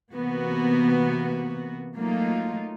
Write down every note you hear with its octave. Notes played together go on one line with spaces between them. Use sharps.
C3 E3 A#3 B3 F#4
F#3 A3 A#3 D#4 F4